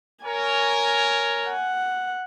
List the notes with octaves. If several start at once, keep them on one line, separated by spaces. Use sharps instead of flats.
A#4 C#5 G#5
F#5